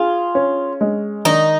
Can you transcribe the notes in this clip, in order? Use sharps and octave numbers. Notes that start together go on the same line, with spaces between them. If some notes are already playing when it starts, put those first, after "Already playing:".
Already playing: F4 G#4
C#4
G#3
D#3 D#4